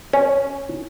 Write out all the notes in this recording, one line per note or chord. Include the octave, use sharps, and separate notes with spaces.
C#4